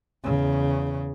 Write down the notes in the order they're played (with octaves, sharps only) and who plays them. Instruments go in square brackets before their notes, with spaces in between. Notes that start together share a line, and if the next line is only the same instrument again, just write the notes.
[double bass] E2 C#3